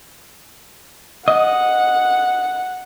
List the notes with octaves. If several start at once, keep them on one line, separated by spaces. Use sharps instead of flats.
D#5 F#5